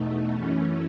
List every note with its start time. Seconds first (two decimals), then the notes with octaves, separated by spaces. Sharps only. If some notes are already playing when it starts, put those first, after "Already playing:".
Already playing: E2 B2 A3 D#4
0.33 F#2 E3 A3 C#4